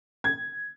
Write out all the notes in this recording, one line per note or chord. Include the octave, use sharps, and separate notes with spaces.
G#6